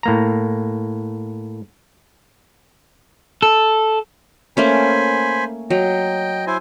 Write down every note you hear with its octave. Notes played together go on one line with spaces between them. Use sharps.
A2 A#3 A#5
A4
A3 A#3 C#4 C5 G#5 B5
F#3 D#5 G5
E4 C5 G#5